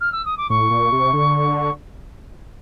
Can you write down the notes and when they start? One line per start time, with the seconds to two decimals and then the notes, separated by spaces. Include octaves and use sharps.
0.01 F6
0.12 E6
0.25 D#6
0.37 D6
0.50 A2 C#6
0.71 A#2
0.92 C3
1.13 D3